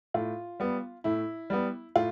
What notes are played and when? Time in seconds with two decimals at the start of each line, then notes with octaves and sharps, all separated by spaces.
0.14 A2 F4
0.60 G3 B3
1.04 A2 E4
1.50 G3 B3
1.96 A2 F4